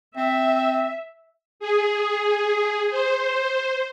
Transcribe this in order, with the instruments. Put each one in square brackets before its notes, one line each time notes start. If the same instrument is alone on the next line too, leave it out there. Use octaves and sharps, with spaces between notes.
[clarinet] C4 [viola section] E5
[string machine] G#4
C5